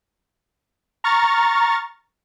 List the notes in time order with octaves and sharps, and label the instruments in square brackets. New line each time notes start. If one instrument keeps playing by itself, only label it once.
[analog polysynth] A#5 C#6 F6 A6